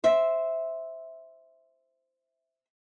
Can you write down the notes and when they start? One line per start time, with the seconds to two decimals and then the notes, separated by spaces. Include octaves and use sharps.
0.04 C5 E5